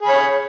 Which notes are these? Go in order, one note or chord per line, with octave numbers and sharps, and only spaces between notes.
G#4 C#5 B5